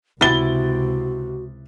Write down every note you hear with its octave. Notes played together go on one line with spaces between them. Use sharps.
C#2 C3 E4 F#4 A6 G7